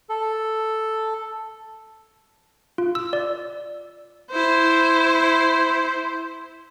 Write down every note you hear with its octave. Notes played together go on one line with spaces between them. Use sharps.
A4
F4
E6
D5
E4 C5